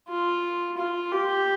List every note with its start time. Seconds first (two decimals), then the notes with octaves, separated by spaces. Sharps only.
0.08 F4
0.77 F4
1.11 G4